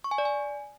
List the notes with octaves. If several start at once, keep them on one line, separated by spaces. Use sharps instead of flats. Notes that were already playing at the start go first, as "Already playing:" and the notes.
C#6
G#5
D5
G#5